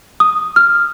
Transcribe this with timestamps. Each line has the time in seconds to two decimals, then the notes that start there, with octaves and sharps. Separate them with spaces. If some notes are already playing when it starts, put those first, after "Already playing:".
0.20 D#6
0.56 F6